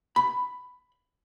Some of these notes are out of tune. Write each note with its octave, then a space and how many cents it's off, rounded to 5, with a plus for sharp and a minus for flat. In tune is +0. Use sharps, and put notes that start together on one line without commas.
B5 +10